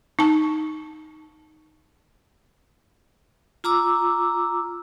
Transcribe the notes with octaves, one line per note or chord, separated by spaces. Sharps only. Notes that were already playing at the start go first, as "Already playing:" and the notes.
D#4 A5
F4 A#5 D6 E6